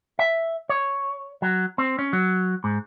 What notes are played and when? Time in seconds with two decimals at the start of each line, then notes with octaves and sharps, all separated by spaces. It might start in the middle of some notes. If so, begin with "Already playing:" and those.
0.19 E5
0.69 C#5
1.42 F#3
1.78 C4
1.99 C#4
2.13 F#3
2.64 G#2